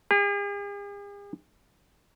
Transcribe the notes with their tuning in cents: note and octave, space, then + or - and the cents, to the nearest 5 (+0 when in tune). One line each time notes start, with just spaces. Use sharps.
G#4 -45